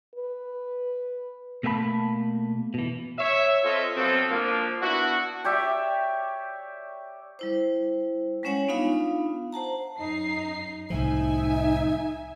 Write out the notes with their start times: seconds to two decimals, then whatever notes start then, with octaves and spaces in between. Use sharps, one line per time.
0.15 B4
1.63 B2 A3 A#3 E5 A5 B5
2.74 B2 E3
3.19 C#5 E5
3.64 C4 F4 A4 C#5 D#5 E5
3.96 B2 F3 F#3 C4 F4 A4
4.30 F3 A#3 D4
4.82 B3 D4 E4 F#4
5.44 G4 C#5 D5 E5
7.39 G3 E4 C5
8.43 G3 G#3 C#4 C#5 F#5 G#5
8.68 B3 D4 D#4 F4 F5 B5
9.53 C5 F#5 A5 A#5
9.99 F#2 D#4 C7
10.90 C2 A2 F3 D#4 E5 G#5